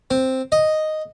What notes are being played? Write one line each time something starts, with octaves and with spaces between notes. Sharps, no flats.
C4
D#5